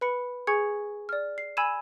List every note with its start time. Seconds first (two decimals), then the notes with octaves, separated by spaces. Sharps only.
0.01 B4 B5 C#7
0.47 G#4 G#5 C#6 G#6 C#7
1.09 D5 F6
1.38 C7
1.57 G#5 B5 E6 G#6 D#7 E7